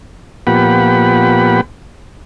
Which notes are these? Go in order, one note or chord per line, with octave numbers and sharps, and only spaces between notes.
A#2 F3 B3 G4 F#5 B5